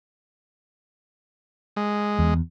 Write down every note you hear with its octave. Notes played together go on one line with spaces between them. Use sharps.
G#3
E2